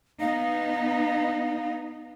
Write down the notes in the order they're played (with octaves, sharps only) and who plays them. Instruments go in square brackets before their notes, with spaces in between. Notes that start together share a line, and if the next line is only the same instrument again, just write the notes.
[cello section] B3 D#4 [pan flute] F5